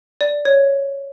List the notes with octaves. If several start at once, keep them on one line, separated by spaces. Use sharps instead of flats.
D5
C#5